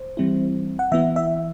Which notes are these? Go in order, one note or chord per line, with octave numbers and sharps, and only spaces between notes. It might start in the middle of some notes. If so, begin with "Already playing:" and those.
Already playing: C5
E3 G3 C4 E4
F#5
E3 B3 E4 E5
E5